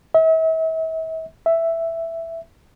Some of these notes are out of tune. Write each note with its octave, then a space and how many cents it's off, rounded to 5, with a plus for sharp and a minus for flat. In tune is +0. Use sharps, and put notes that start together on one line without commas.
E5 -40
E5 +5